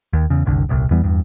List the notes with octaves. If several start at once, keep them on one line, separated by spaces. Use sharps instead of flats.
D#2
E2 C#3
F#1 C2 D3
D#1 C2
E2 E3 G3 B3
E2 G2